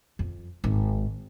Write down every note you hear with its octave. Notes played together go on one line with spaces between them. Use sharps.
F2
G#1